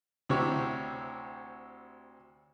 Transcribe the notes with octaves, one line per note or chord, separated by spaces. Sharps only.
D2 C3 E4 G4 C#5 C#6